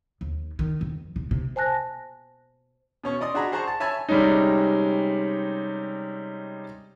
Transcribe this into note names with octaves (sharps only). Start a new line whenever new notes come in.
D#2
D#3
F2
C3
C3
C5 G#5 A5 F#6 A#6
B2 C#4 C#6
D5 D#5 C6 D#6
D4 F#4 G#4 A#5 B5
G#4 C5 F#5 A5 A#5 C#6
A5
C#5 E5 G#5 A5 B5 C#6
C3 G3 G#3 C#4 D#4